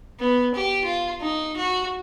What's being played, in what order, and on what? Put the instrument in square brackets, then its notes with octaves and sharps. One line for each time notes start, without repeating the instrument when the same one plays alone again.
[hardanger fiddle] B3
G4
F4
D#4
F#4